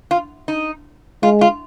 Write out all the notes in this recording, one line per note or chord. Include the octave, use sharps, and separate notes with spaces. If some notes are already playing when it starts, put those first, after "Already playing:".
F4
D#4
G#3 F4
F4